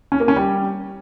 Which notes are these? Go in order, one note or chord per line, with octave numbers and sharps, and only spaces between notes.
C#4
A#3
C#4
G3